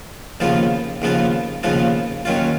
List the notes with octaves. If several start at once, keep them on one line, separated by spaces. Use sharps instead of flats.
D#2 C#3 F3 B3 F4
D#2 C#3 F3 B3 F4
D#2 C#3 F3 B3 F4
D#2 D#3 F#3 C#4 F4